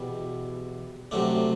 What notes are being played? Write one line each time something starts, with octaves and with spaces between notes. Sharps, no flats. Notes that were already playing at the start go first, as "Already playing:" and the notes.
Already playing: E2 B2 G3
C3 F#3 A3 D4